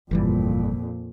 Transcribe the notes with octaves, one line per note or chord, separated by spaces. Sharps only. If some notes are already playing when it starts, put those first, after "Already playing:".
G1 F2 A#2 E3 G3